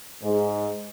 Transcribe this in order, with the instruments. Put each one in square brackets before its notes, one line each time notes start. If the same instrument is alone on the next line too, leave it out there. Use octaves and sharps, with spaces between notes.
[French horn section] G#2